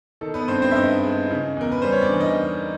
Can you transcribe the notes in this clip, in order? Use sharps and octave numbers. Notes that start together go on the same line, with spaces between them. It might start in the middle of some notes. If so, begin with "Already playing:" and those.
D#3 A4
B3 B4
G2 C4 C5
C4 C5
E5
G2 D#4 D#5
G#3
C#3
E2 A#4
B4
G3 C5
C#5
D4 D5
E3
D#4 D#5